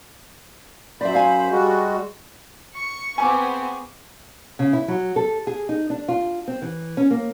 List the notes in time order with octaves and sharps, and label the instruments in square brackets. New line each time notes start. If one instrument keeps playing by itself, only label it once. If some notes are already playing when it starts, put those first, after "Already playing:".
[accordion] F#2 C5 B5 [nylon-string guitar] D5 E5
[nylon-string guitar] F5 G#5
[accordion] G3 G#3 F#4
[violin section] C#6
[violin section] B3 C4 G#4 [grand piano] G#5 C#6 D6
[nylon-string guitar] C#3
E4
F#3
A4
G#4
D#4
D4
F4
C4
E3
C#4
A#3